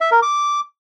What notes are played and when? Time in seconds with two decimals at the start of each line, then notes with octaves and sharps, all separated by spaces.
0.01 E5
0.11 A#4
0.22 D6